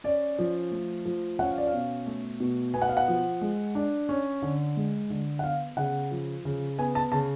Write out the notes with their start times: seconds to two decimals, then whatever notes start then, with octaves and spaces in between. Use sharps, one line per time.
0.04 C#4 D5
0.39 F3
0.72 A3
1.05 F3
1.39 C#4 F#5
1.48 F5
1.58 D5
1.67 F5
1.73 B2
2.07 A3
2.40 B2
2.74 B3 G#5
2.82 F#5
2.89 F5
2.97 F#5
3.08 F3
3.41 G#3
3.75 D4
4.09 C#4
4.42 D3
4.76 G#3
5.10 D3
5.39 F#5
5.44 B3 F5
5.77 C#3 F#5
6.11 F3
6.45 C#3
6.78 B3 G#5
6.95 A5
7.12 C#3 A5